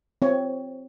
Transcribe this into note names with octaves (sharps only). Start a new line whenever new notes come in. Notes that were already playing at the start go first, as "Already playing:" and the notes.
C4 C#5